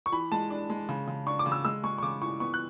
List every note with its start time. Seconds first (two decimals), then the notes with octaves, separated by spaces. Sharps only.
0.06 C#6
0.12 E3 B5
0.32 G#3 A5
0.50 D4
0.70 G#3
0.89 C#3
1.07 C#3
1.27 D4 C#6
1.39 D6
1.46 C#3
1.52 E6
1.65 G#3 E6
1.83 G#3 C#6
1.98 C#6
2.02 C#3 D6
2.22 E3 C#6
2.40 B3 C#6
2.54 F#6